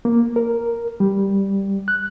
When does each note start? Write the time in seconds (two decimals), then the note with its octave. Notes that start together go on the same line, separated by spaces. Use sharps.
0.05 A#3
0.36 A#4
1.00 G3
1.88 F#6